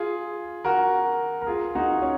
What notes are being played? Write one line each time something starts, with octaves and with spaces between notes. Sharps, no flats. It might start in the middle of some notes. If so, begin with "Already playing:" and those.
Already playing: F4 G#4
F#4 A#4
A#4
F4 G#4
D#4 F#4
C#4